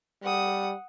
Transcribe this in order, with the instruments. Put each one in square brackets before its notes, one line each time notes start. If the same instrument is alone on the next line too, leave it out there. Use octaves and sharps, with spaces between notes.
[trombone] G3 [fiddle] F#5 D#6